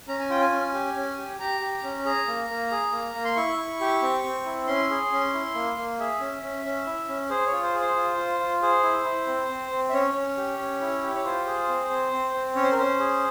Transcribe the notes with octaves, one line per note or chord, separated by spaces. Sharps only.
C#4 A#5
G#5
F4 G5
G#5
C#4
G4
C#4
G4
G4 A#5
G4
C#4
G#4 A#5
A#3
A#3
G#4
A#3
A#3
C6
E4 C#6
E4
G4
C4
C4
E4
C#4 C6
G#4
C#4
E4
A#3
A#3
G#4 E5
C#4
C#4
C#4
E4
C#4
G#4 C5
C#5
F4
C5
G#4 C5
F4
F4
F4
G#4 C5
E4
E4
C4
C4
C4
E5
C#4 C#5
C#4
G4
C#4
E4
G4
C#5
F4 C5
G#4
C4
C4
C4
C4
C#4 C#5
C5
A#4
C#4 C5
G#4